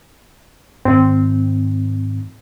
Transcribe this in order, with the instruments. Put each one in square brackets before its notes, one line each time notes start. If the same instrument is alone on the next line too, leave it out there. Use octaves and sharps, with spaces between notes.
[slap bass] G#2 D#3 [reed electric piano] C4